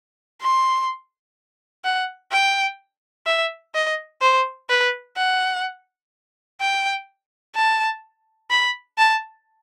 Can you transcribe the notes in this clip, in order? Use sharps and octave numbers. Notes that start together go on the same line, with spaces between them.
C6
F#5
G5
E5
D#5
C5
B4
F#5
G5
A5
B5
A5